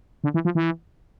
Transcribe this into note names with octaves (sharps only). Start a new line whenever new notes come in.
D3
E3
F3
E3